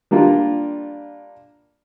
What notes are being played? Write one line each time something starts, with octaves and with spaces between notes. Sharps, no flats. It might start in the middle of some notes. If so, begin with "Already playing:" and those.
G3 A#3 D4 F4